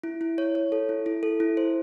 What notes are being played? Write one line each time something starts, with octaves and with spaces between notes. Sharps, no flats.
E4
E4
C#5
C#5
A4
E4
E4
A4
E4
C5